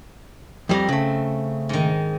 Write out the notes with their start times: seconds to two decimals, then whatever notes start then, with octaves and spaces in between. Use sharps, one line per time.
0.69 F2 G3 C4 A#5
0.89 C#3 A3
1.69 G#2 D#3